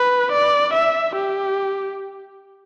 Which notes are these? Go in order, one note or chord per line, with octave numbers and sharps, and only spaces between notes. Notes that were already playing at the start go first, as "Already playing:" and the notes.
Already playing: B4
D5
E5
G4